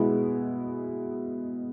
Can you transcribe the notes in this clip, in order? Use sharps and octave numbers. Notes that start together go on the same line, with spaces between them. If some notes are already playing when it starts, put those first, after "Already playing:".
Already playing: B2 G#3 B3 E4